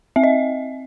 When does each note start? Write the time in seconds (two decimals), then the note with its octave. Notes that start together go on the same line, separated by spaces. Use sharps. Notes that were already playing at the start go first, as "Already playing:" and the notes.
0.16 C4 E5
0.24 D#5